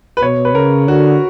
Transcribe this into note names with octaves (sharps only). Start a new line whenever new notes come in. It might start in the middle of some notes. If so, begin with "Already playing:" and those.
B4
B2 C#5
B4
C#3 A#4
D3 F#4